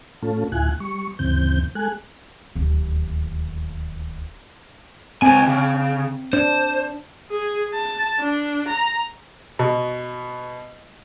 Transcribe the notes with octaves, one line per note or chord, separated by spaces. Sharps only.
A2 A3 C#4 F4 A4
D2 A2 E4 F4 G#5 F#6
G3 C#6
D2 G2 C#3 E3 C4 G6
G#3 A4 G#5 F#6
D1 D#2
C#2 C4 G#5
C#3
D4 C5
G#4
A5
D4
A#5
B2